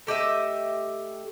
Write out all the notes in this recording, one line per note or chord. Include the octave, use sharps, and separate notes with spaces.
A3 G4 D#5 E5